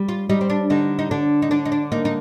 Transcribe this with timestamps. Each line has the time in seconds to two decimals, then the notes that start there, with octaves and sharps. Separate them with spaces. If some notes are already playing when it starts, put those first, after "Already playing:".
Already playing: G3
0.09 F4
0.29 G3 D#4
0.41 C4
0.50 D4
0.70 D3 D#4
0.99 D#4
1.11 D3 D4
1.42 D#4
1.51 D3 D4
1.65 D#4
1.72 D4
1.92 A#3 D#4
2.05 D#4